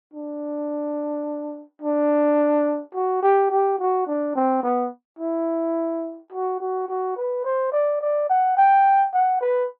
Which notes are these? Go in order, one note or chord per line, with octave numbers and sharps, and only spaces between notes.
D4
D4
F#4
G4
G4
F#4
D4
C4
B3
E4
F#4
F#4
F#4
B4
C5
D5
D5
F#5
G5
F#5
B4